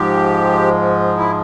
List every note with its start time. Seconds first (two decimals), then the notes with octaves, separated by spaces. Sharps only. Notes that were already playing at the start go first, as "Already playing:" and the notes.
Already playing: G#2 F3 G#3 G4
1.18 E4